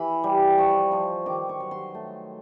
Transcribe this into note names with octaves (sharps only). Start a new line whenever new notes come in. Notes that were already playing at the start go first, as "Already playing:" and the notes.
Already playing: E3 B5
G3
F3 C#6
F3
D#3 D6
C#6
F#3
C6
A3